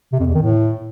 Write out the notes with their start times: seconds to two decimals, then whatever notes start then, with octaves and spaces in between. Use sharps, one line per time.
0.12 C3
0.20 F2
0.27 E2
0.35 D#3
0.42 A2